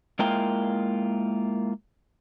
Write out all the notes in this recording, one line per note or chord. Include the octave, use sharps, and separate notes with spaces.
G#3 A#3 E4 F4 A#4 G5